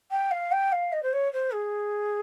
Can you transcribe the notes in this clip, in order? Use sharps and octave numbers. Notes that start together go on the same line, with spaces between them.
G5
F5
G5
F5
D#5
C5
C#5
C5
G#4